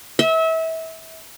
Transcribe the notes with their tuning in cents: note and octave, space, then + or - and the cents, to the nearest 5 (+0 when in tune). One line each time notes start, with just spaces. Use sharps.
E5 -30